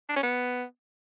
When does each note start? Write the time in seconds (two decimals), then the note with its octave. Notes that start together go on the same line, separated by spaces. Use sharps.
0.09 D4
0.16 C#4
0.23 B3